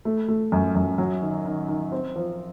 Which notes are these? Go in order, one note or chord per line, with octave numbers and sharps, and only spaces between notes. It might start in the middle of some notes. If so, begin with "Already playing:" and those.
A3
A3
F#2
F#2
F#3
D#3
D#3
D#3
C4
F3